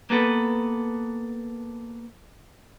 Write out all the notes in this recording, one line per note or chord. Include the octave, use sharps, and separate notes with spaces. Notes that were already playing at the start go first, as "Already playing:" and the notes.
A#3 B3 A4 B4